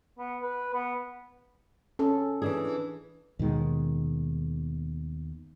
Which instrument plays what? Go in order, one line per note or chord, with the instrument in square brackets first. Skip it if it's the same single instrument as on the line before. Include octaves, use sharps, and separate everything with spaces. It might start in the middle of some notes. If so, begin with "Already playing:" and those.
[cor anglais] B3
B4
B3
[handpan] C#4 A4
[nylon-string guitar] E3 D4 G#4
[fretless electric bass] D#2 B2 D#3 G#3